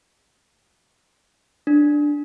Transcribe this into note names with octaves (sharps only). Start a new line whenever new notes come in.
D4